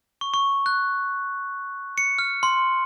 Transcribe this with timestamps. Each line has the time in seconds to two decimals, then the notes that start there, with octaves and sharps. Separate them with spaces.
0.21 C#6
0.34 C#6
0.66 F#6
1.98 C#7
2.19 F6
2.43 C6